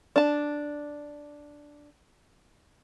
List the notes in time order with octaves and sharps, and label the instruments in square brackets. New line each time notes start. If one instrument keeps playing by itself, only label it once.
[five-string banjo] D4 A5